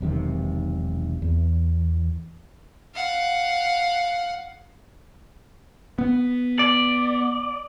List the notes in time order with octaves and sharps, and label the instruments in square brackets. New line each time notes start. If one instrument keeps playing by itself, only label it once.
[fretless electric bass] E1 B1 C3 D#3
E2
[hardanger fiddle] F5 F#5
[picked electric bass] B3
[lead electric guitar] D5